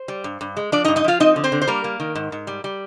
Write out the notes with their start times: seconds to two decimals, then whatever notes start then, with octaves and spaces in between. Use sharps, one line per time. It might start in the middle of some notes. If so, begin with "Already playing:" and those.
Already playing: C5
0.08 G3
0.24 G2
0.41 G2
0.57 G#3
0.72 F3 D4 D5
0.84 D#4 D#5
0.88 G2
0.96 D#4 D#5
1.04 F3 F4 F5
1.20 C4 D#4 D#5
1.36 D3
1.44 C4 C5
1.52 D3
1.62 C5
1.67 G3 A#3 A#4
1.84 A#3
2.00 D#3
2.15 G#2
2.32 G#2
2.47 G3
2.64 G3